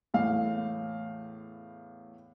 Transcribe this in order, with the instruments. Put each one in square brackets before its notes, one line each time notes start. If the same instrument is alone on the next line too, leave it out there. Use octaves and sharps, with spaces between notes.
[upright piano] E2 A2 F5